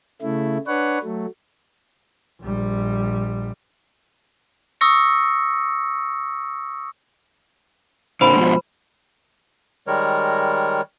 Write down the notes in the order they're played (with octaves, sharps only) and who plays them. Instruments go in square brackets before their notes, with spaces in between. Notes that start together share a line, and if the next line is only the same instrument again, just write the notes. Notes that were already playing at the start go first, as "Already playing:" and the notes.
[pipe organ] C#3 A3 E4
D4 B4 C#5 F#5
F#3 A3
[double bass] A#1 G3
[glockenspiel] C#6 D#6 E6 A#6 C#7
[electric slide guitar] A#2 D3 [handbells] C5 B5 C6
[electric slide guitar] G#2 B2 F3
[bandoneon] D#3 G3 G#3 A#4 C#5